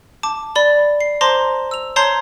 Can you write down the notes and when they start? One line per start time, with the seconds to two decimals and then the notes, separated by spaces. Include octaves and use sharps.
0.23 A5 D6
0.55 D5 B5 G7
1.01 C7
1.21 C5 A5 A#5 C6 D6 A#6
1.71 E6 F7
1.96 C#5 A5 A#5 C6 G6 C7